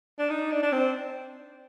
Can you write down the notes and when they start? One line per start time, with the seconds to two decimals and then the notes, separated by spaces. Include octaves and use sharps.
0.19 D4
0.29 D#4
0.51 D4
0.62 D4
0.72 C4